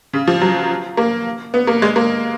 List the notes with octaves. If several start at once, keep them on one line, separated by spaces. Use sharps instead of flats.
C#3
F3
F#3
A#3
B3
A#3
G#3
A#3